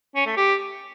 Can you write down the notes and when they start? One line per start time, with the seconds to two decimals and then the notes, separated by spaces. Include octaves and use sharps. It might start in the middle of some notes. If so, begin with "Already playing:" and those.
0.16 C#4
0.26 A3
0.37 G4